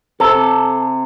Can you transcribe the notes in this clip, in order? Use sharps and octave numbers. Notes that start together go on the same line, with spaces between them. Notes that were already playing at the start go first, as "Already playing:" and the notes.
C3 A4